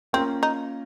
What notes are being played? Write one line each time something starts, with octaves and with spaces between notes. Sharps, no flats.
A#3 C4 C#4 F4 A#4 F5
D#4